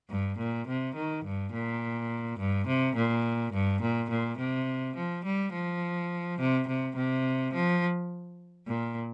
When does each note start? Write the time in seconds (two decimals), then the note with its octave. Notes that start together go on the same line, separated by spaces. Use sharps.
0.10 G2
0.38 A#2
0.68 C3
0.96 D#3
1.25 G2
1.53 A#2
2.39 G2
2.68 C3
2.96 A#2
3.54 G2
3.82 A#2
4.10 A#2
4.38 C3
4.96 F3
5.25 G3
5.54 F3
6.40 C3
6.68 C3
6.96 C3
7.54 F3
8.68 A#2